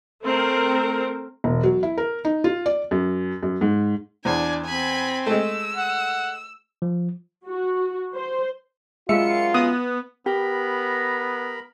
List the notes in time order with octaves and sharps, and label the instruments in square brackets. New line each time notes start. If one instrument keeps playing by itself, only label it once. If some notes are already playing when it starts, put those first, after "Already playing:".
[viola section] A3 C4 A#4
[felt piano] E1
F#3
E4
A#4
D#4
F4
D5
F#2
F#2
G#2
[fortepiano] E2 C5 [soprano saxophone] D4 [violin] G#5
[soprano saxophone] C4 [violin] G#5 B5
[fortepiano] G#3 A3 [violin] E6
[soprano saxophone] F#5
[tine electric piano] F3
[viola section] F#4
C5
[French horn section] F#2 F4 [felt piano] G#3 [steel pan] E5 [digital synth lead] C#7
[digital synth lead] B3 [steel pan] D#6
[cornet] B3 [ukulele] G4 [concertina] A#4 A#5 B5